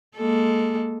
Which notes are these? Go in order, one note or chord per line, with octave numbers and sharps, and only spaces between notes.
G#3 A#3 A4